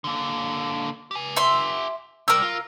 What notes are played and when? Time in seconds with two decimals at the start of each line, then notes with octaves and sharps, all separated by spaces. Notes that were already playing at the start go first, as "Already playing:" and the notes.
0.04 D3 A#3
1.11 G4 G#5
1.36 E5 C6
2.28 C3 G3 A#4 E6
2.42 F4